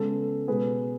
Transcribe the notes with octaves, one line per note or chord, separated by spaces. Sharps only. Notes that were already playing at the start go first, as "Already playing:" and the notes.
Already playing: C#3 G#3 B3 A4
B2 G#3 B3 G#4 B4